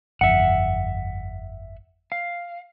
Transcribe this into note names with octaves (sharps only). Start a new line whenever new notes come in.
G1 F2 E5 F#5
F5